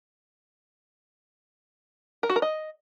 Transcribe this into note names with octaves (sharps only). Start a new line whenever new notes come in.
A#4
F#4
A#4
D#5